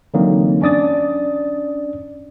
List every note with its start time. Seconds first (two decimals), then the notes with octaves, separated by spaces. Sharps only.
0.14 D3 E3 F#3 A#3 C4 D#4
0.62 C#4 D4 D5 D#6 A6